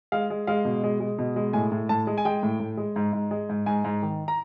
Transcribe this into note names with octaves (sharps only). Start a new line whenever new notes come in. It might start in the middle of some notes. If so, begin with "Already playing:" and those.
G#3 F5
G#3
G#3 F5
B2
G#3
G#3
B2
G#3
A2 G#5
A2
A2 A5
G#3
G#5
G#3 G5
A2
A2
G#3
G#2
G#2
G#3
G#2
G#2 G#5
G#2
D#3
A#5